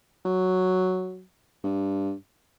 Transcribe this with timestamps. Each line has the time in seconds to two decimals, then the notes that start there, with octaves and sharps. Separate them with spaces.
0.25 F#3
1.64 G2